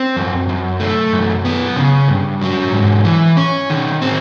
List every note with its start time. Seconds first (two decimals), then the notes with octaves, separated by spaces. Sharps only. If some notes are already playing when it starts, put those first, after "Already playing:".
Already playing: C4
0.16 F#2
0.49 F#2
0.80 A3
1.13 F#2
1.45 B3
1.76 C#3
2.08 G2
2.42 F#3
2.73 G#2
3.05 E3
3.37 C#4
3.70 D#3
4.02 C4